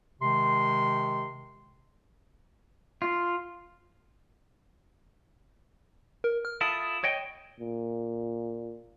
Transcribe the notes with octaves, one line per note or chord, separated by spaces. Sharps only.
C3 D#3 G#3 C6
F4
A#4
F6
E4 F4 A4 D#6
C#5 D#5 G5
A#2